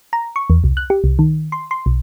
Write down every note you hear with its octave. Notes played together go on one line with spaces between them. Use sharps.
A#5
C#6
E2
C2
F#6
G4
C2
D#3
C6
C6
B1